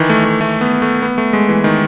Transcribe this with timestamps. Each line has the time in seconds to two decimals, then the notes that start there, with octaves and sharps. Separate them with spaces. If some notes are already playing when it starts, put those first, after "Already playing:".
Already playing: D#3 E3
0.09 A3
0.25 A3
0.41 A3
0.61 B3
0.82 A3
1.02 B3
1.18 A3
1.33 G#3
1.49 E3
1.64 D#3